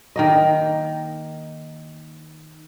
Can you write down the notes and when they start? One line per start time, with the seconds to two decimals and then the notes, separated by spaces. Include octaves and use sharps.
0.16 D#3 A#3 D#5